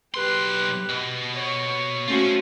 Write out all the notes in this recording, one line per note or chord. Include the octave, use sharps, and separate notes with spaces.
B1 G4 B4 C6
B2
C#5
A3 C#4 F4 F#4 C5